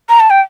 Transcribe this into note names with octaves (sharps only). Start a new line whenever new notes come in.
A#5
A5
G5